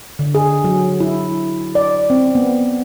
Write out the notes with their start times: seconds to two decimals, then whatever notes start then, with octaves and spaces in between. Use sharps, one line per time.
0.19 D3
0.35 G#4
0.64 F#3
1.00 E4
1.75 D5
2.10 C4
2.35 B3